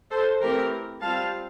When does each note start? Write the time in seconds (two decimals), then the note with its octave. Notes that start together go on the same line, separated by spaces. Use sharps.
0.10 A4 C5
0.41 E3 A3 C4 E4 G4 A#4
1.01 G3 C4 F4 F5 A5